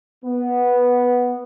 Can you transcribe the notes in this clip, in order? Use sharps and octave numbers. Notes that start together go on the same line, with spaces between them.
B3